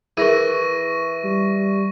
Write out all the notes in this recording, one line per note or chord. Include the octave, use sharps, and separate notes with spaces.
E3 G#4 A#4 C#6 A#6 D#7
G3